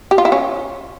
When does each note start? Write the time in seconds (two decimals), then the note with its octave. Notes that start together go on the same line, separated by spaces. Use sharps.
0.11 G4
0.18 F4
0.25 E4
0.32 C#4